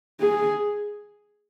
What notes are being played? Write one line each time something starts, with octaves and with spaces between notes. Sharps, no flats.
G#4